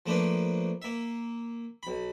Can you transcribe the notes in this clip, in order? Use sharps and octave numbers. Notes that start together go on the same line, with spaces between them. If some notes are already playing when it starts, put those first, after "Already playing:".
F3 A3 A#3 D4 B4
A#3 E5
B1 B5